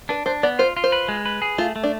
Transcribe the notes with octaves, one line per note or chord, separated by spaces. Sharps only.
D4 B4
D4 C5
B3 D5
F4 C5
F4
C5
B4
G#3
B4
G#4
A3 F4
A3
D4